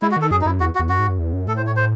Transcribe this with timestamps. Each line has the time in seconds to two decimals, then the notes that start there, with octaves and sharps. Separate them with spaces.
0.02 G#3 E4
0.11 F#4
0.16 D#3
0.22 A4
0.31 F#2 G#4
0.41 D#4
0.45 F#2 E4
0.60 E2 F#4
0.75 F#4
0.79 E2
0.89 F#2 F#4
0.99 G#2
1.09 F#2
1.19 E2
1.33 F#2
1.48 A2 A4
1.57 C5
1.66 C#5
1.76 C5